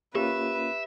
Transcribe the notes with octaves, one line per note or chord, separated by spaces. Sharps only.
A#3 C#4 F4 G4 B4 E5